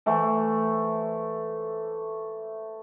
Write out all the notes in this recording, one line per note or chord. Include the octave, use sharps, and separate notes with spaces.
E3 A3 C5 F#5